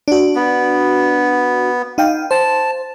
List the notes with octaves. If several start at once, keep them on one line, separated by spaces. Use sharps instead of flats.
D4 F#4
B3
D#4 F5 G5
C5 A5